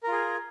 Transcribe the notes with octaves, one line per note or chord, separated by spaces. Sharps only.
F4 G#4 A#4